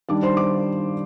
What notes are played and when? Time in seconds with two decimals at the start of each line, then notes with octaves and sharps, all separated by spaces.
0.09 D#3 G3 D4 D5 D6
0.23 C5 C6
0.37 D5 D6